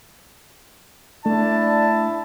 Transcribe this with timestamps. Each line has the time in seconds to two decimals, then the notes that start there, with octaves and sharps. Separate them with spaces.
1.26 A3 D4 E4 A5